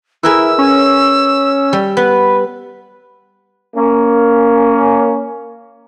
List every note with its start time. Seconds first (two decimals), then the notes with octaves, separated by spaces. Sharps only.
0.23 E4 G#4 A#4 B4 E6
0.58 C#4
1.73 G3
1.97 B3 B4
3.74 A#3 C#4